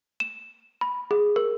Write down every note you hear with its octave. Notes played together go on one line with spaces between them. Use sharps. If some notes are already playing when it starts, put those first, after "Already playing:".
E7
B5
G#4
A#4